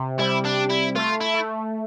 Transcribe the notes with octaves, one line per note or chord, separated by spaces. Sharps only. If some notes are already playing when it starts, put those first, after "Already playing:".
Already playing: C3
G3 E4
D4
E4
A3 F4
E4
A3